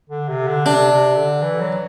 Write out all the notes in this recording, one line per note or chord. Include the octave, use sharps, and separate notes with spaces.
D3
C3
D3
C3 D4
C3
D3
E3
F#3